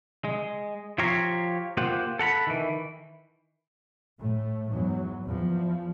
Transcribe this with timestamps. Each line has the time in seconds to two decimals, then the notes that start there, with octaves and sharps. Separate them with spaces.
0.25 G#3
0.98 F3 F4 G4 C#5 F5 A#5
1.77 A#3 F4 G4 C5 F#5
2.19 A4 F#5 A#5 B5
2.47 D#3 E3
4.19 A2 A3
4.70 E2 G#2 F#3
5.24 E2 F3